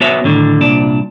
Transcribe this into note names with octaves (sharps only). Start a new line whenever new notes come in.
B3 F#4 C#5 E5
A2 D3 D#3
C2 A#2 D4